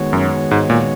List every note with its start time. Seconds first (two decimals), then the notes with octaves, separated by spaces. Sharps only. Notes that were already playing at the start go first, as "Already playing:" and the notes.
Already playing: D#3 G#3 B3 F#4 C#5
0.13 F#2
0.51 G#2
0.70 A#2